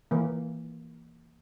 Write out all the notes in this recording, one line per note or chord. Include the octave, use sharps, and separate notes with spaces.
E3 A#3